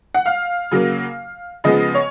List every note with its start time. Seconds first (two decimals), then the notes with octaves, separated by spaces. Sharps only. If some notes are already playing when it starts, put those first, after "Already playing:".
0.15 F#5
0.26 F5
0.71 C#3 F#3 A#3
1.64 C#3 F3 G#3 B3 D#5
1.95 C#5